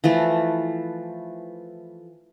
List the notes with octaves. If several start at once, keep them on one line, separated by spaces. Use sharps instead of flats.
E3 F3 A3